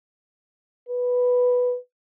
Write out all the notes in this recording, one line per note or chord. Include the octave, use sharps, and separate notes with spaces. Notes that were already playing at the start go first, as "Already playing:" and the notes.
B4